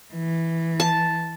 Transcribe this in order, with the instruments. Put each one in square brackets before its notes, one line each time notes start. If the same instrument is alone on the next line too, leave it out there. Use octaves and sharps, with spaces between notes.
[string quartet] E3
[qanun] A5